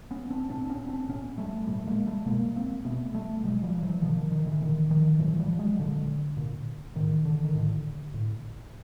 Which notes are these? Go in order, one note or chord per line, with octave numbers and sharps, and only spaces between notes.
B3 C#4
C4 D4
A#2 C4 D4
D4
B3 C#4
C4 D4
A#2 B3 C#4
G3 A3
A#2 G3 A3
G#3 A#3
G3 A3
B2 G#3 A#3
A#3 C4
B2 A3 B3
G3 A3
B2 F#3 G#3
F3 G3
E3 F#3
B2 D#3 F3
D#3
D#3
D3 E3
A#2 D#3
D#3 F3
A#2 E3 F#3
F3 G3
F#3 G#3
A#2 D3
A#2
A2 D#3
D3
D#3
A2 D3
A2